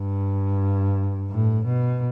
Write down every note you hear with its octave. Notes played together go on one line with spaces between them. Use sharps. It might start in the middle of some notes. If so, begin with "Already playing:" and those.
Already playing: G2
A2
B2